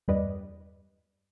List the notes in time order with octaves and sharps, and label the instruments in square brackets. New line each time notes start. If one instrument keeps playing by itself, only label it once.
[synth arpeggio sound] E2 G2 G3 B4 D5 D#5